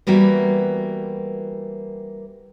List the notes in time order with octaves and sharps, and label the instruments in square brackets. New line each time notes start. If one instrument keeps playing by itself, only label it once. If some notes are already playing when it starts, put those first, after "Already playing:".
[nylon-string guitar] E3 G3 A#3 B3 F#4